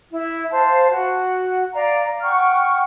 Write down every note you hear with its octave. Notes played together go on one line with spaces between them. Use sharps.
E4
C5 F5 A5
F#4 F#5
D5 F5 A#5
F#5 G5 C#6 F6